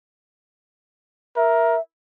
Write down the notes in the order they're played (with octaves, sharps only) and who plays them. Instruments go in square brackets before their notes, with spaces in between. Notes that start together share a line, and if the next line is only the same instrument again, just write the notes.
[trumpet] A#4 [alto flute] E5